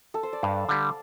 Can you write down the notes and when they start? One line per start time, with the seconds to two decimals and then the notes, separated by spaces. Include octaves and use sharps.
0.14 A4
0.23 C5
0.33 D5
0.43 G2 F5
0.69 D3 G3